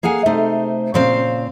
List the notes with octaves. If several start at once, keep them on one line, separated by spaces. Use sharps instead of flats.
A#3 G#4 F5 F#5 G#5
C3 A3 D#4 C5
A#2 C#3 C4 C5 F5